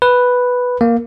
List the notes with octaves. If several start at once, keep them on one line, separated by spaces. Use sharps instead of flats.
B4
A#3